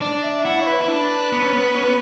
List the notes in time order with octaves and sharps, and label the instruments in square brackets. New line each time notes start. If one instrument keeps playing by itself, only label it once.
[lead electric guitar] D4 [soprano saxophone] D5
[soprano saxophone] E5
[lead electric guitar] E4 [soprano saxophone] F#5
[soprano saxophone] C#5
B4
[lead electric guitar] E4
D4
B3
C#4
B3
C#4
B3